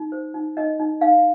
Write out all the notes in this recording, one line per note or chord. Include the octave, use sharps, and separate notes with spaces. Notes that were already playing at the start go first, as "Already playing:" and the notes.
Already playing: D#4
C5
D#4
D#4 D#5
D#4
D#4 F5